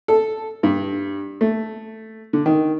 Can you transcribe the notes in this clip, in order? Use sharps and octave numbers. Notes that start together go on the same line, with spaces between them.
A4
G2
A3
D3
D#3